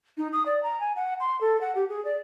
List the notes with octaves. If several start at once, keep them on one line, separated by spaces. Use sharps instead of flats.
D#4
D#6
D5
A#5
G#5
F#5
C6
A4
F#5
G4
G#4
D5